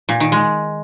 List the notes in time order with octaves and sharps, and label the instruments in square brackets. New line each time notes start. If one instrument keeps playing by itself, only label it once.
[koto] A#2
D#3
G#3